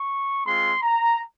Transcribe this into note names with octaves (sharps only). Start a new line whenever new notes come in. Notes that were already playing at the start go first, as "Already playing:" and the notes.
Already playing: C#6
G#3 C4 F4 C6
A#5